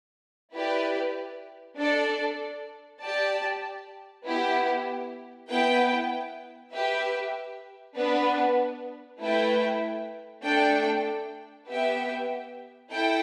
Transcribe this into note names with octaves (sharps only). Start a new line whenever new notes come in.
E4 G4 B4 D5
D4 A4 D5
G4 D5 A5
B3 E4 G4
B3 E4 B4 G5
G4 B4 E5
B3 D4 B4
A3 E4 B4 E5 G5
A3 D4 A4 G5
B3 G4 E5 G5
E4 A4 G5